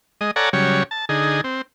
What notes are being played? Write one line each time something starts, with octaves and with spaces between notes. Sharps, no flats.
G#3 D#5
A4 C#5 D5 F#5 G#5 A#5
C#3 F#3 G3 C#5
A5
D3 D#4 G#4
C4